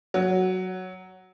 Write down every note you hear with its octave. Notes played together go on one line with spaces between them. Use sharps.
F#3